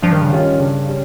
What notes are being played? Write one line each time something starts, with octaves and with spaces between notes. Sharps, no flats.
G2 F3
D#3
C#3
D#3 G3 C#4 F4
G2 C#3
G3 C#4